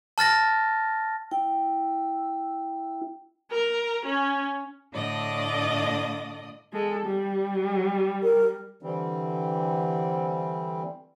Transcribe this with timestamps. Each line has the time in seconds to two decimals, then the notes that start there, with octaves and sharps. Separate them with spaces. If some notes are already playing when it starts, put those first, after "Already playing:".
0.18 A5 F6 A6 A#6
1.31 E4 G5
3.51 A#4
4.05 C#4
4.92 A2 D3 A3 D5 D#5 D#6
6.73 G#3 A4
7.06 G3
8.23 A#4
8.83 D3 E3 G3 C4